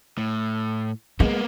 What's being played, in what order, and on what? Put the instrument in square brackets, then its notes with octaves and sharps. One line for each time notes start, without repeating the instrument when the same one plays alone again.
[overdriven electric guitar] A2
[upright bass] G#3 [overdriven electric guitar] A#3 B3